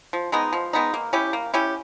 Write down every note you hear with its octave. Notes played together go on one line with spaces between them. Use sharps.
F3
G#3 B3 D#4
F3
G#3 B3 D#4
A#3
C#4 E4 G4
A#3
C#4 E4 G4